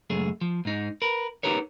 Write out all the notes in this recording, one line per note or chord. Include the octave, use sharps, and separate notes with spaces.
C#2 F#2 A3 G#4
F3
G#2 D#4
A#4 B4
D#4 F4 G4 A#4 B4 C#5